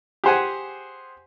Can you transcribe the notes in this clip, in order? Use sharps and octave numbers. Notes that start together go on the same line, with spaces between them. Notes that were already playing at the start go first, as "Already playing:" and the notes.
G4 G#4 C5 F#5 G#5